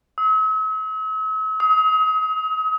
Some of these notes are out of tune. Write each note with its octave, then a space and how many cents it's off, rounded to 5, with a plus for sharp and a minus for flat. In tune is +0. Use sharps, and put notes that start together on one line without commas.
E6 -45
D#6 +35